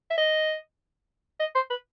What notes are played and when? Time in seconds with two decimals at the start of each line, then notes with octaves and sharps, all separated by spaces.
0.11 E5
0.18 D#5
1.40 D#5
1.55 C5
1.70 B4